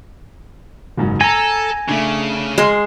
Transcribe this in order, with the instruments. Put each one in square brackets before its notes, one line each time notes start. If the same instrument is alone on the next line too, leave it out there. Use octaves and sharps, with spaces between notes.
[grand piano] F#1 G#2 F#3
[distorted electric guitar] A4 [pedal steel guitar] G#5 A#5 [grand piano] A#6
[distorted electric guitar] C#3 [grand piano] A3 D4
[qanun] G#3 C6 [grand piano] F6 C7 E7